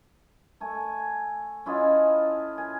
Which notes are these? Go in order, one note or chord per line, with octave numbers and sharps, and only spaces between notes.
A3 G#5
C#4 E4 F4 D#5
G#5